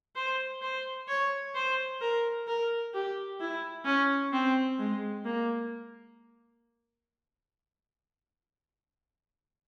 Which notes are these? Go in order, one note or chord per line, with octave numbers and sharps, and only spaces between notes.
C5
C5
C#5
C5
A#4
A#4
G4
E4
C#4
C4
G#3
A#3